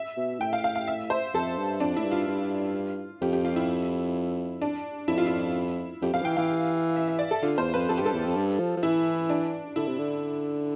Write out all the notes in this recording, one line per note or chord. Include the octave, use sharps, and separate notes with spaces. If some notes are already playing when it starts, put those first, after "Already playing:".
Already playing: E5
B2
A2 G5
F5
F5
F5
E5
C5
F2 A4
G2
F2 D4
A2 E4
G2
F4
G2
F2 G4
G4
F4
E4
D4
F2 E4
F4
E4
F2 G4
F2 F5
F3
E3 G5
E3 F5
E5
E5
D5
A4
D3 F4
E2 C5
F2 B4
F2 A4
G4
G2 A4
E2
F2
G2
F3
F3
E3 E4
D4
D3 E4
C3
D3